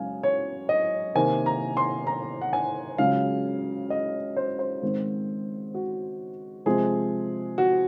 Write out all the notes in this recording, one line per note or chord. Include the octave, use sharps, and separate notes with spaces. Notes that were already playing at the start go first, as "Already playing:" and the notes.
Already playing: F#2 C#3 G#3 F5 G#5
C#5
D#5
C3 D#3 A#3 G#5
A#5
C6
A#5
F#5
G#5
C#2 C#3 F#3 F5
D#5
C5
C5
G#2 D#3 G#3 C4
F#4
C3 F3 G#3 C4 G#4
F#4